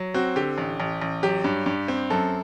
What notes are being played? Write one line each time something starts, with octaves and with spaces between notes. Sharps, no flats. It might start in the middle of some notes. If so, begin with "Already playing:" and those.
Already playing: F#3
C4 F#4
D3 G4
A1
A1
A1
F#3 G4
G2
G2
C4
F#2 A4